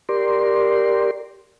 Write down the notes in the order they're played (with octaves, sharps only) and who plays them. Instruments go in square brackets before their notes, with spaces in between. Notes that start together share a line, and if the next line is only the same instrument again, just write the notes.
[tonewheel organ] G4 A#4 D5 C6